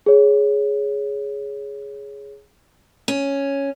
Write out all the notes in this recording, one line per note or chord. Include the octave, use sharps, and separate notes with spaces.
G#4 C#5
C#4